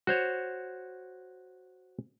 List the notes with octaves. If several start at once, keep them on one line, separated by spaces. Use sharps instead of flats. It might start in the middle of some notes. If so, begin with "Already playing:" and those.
F#4 C5 C#5